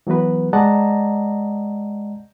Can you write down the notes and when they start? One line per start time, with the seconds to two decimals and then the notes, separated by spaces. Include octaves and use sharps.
0.07 E3 F#3 B3 F#4 B4
0.53 G#3 D5 D#5 F#5 A5 A#5